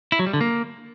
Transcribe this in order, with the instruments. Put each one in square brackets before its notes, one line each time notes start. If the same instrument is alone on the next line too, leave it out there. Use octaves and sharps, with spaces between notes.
[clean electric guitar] E4
F#3
G3
D3
A#3